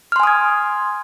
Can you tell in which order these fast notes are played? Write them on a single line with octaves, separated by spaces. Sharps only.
F6 C6 G#5 D#6 G#6